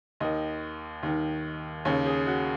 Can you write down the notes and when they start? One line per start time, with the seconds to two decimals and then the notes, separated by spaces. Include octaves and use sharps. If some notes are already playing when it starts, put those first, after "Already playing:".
0.20 D#2 D#3 D#5
1.03 D#2 D#3
1.85 D#2 C#3 C#5
2.06 G#4
2.26 F#4